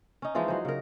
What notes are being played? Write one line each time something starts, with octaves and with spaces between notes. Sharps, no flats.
C#4 D#4
E3 F3 G#3 D#4
F#3 C5
C#3 A#4